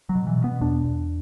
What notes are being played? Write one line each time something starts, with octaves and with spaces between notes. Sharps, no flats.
F#3
B2
E3
B2
B3
E2 D4
E2